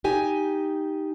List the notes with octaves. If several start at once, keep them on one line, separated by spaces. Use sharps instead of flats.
D#4 G4 G#5